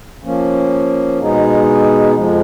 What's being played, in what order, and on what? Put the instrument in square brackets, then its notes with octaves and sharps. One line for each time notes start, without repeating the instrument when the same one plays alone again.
[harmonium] F3 A#3 C#4
B2 G#3 B3 D#4 G#4
F2 F3 G#3